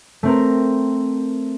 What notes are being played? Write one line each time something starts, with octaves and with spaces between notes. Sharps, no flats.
A3 C4 A#4